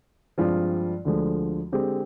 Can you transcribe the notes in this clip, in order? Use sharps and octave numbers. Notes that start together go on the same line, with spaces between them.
G2 F3 G#3 C4 F4
D2 D3 F3 G#3
D3 G#3 C4 G4